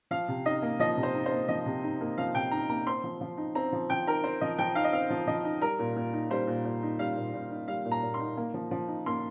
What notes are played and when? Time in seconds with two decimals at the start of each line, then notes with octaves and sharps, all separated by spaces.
0.11 F3 F5
0.28 C3
0.45 D#4 D#5
0.62 A#3
0.79 F3 D#5
0.97 C3
1.03 C5
1.14 D#4
1.26 C5
1.32 A#3
1.48 F3 D#5
1.66 C3
1.84 D#4
2.01 A#3
2.18 F3 F5
2.35 C3 G5
2.51 D#4 A#5
2.69 A#3 A#5
2.86 C4 C6
3.04 F3
3.21 F3
3.38 D#4
3.55 C4 A#5
3.72 F3
3.90 F3 G5
4.07 D#4 A#4
4.24 C4 C5
4.41 F3 D#5
4.58 F3 G5
4.75 D#4 F5
4.84 D#5
4.92 C4 F5
5.10 F3
5.27 F3 D#5
5.44 D#4
5.62 G3 A#4
5.79 A#2
5.96 A#2
6.13 D#4
6.30 G3 C5
6.48 A#2
6.65 A#2
6.83 D#4
6.99 G3 F5
7.17 A#2
7.33 A#2
7.51 D#4
7.68 G3 F5
7.85 A#2
7.91 A#5
8.02 A#2
8.14 C6
8.20 D#4
8.37 A#3
8.54 F3
8.71 F3
8.88 D#4
9.06 A#3 C6